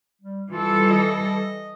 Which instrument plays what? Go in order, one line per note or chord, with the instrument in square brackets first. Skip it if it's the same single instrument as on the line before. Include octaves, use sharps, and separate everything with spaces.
[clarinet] G3
[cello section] E3 G3 A4 [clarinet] F4
[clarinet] D#5